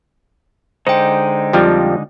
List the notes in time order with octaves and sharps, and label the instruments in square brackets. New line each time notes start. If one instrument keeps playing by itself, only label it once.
[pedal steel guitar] D3 G#3 D#4 [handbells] C5 G5
[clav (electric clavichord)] F2 F3 G3